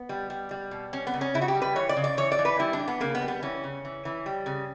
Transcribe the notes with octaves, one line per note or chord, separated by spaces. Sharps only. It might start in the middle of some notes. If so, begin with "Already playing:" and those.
Already playing: B3
G3
G3
G3
B2
G3 C#4
B3
C#3
C#4
C#3 E4
F#4
G4
G3
B4
E3 C#5
D5
C#3
D5
E3 C#5
D5
E3
B4
G3 E4
D4
E3
B3
C#3 A#3
B3
G3
B3
E3 C#4
C#3
E3
E3
G3
C#3